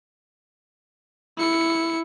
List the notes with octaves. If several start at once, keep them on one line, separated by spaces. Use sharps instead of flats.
E4 C#7